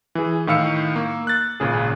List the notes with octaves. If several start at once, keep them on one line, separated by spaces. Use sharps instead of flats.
E3 G#4
A2 D#3 F5 E6 C#7
A#3
F#6 A6
G#1 A#2 C#3 G#4